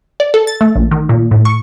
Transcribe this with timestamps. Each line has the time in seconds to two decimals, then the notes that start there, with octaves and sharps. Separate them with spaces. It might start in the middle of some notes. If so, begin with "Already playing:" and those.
0.20 D5
0.34 A4
0.47 A6
0.61 A3
0.76 A#1
0.91 D#3
1.09 A#2
1.31 A2
1.45 C#6